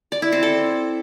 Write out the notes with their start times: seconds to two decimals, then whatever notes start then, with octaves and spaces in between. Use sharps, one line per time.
0.12 D5
0.22 E4
0.32 C4
0.43 A4